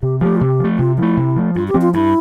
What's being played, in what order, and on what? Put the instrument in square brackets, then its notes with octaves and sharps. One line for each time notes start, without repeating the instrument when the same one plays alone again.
[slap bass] C3 [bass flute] G4
[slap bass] F3 A3 [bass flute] G4
[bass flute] F4
[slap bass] C3 [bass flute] G4
[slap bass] F3 A3
[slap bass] C3 [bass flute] F4
[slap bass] F3 A3 [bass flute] E4
[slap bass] C3
F3 A3
[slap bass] G2 [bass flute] F4
[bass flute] G4
[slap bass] F3 C4
[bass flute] F4
[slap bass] G2 [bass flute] E4